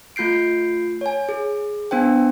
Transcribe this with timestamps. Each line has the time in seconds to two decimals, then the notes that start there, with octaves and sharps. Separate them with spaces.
0.16 A3 F4 G6 C7 D7
1.01 C#5 G#5
1.29 G#4
1.91 B3 D4 C5 G5